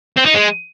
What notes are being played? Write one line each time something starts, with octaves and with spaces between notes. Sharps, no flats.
C4
D#4
G#3